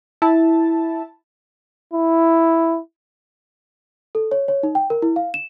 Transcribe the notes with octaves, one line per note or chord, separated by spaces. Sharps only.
E4 A5
E4
A4
C#5
C#5
D#4
G5
A#4
E4
F5
E7